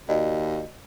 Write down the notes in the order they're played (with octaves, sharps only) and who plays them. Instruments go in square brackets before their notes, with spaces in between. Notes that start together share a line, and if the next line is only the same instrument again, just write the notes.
[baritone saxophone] D#2 [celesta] F#4 D5 D#5